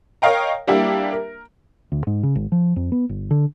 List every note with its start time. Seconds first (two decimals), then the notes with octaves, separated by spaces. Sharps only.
0.22 A#4 C#5 D#5 F5 G5 A#5
0.67 G3 A#3 D4 E4 G4
1.13 A#4
1.92 D2
2.07 G#2
2.23 C#3
2.35 G#1
2.52 F3
2.76 F2
2.92 B3
3.09 G1
3.31 D3